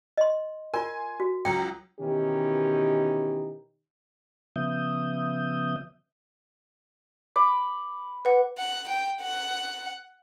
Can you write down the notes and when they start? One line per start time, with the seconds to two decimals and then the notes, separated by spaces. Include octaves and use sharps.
0.17 D#5 C6
0.74 F4 A#4 G#5 C6
1.20 F#4
1.45 C#2 F#3 G5
2.00 B2 D#3 E3 C#4 D#4 G4
4.56 C#3 F3 B3 E5 D#6 G6
7.36 B5 D6
8.25 B4 F#5
8.58 F#5
8.89 G5
9.21 F#5